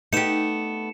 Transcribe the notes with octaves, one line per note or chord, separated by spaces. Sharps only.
A3 B3 D#4 G4 C#7 E7